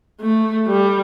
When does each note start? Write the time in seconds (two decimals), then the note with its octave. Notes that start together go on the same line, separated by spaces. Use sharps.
0.21 A3
0.67 G3